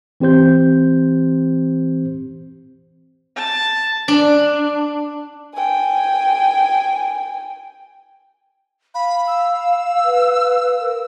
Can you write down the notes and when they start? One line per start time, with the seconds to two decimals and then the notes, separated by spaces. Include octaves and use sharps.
0.20 E3 C4 G4 C5 G6
3.36 A5
4.08 D4
5.54 G5 G#5
8.94 F5 B5
9.27 E6
10.05 B4
10.80 A#4